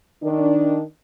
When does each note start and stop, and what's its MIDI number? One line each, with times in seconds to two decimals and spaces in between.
0.23 0.82 51
0.23 0.82 62